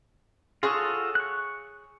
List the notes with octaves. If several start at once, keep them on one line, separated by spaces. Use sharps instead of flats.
F4 F#4 G#4 A4 C#5
C#6 F#6